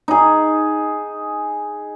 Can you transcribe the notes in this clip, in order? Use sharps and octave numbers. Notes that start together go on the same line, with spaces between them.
D#4 G#4